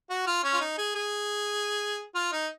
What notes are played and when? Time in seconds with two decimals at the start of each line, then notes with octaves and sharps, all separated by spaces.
0.10 F#4
0.27 F4
0.44 C#4
0.54 F4
0.61 D#4
0.78 G#4
0.95 G#4
2.15 F4
2.32 D#4